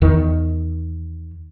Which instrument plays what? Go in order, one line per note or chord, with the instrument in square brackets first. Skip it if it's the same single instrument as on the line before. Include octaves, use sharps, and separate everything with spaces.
[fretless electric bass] E2 D#3